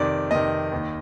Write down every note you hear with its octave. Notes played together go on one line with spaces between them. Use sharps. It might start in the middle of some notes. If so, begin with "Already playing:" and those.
Already playing: F2 C3 D#3 D5
F2 C3 D#3 D#5
D#2 D#3